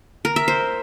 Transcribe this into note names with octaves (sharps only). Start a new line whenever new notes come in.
A#4
E5
C5